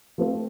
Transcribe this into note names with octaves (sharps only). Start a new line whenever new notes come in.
F3 A3 C4